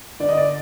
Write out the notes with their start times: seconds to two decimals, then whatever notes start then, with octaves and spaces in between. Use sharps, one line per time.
0.20 D3 D5
0.29 D#5
0.37 D5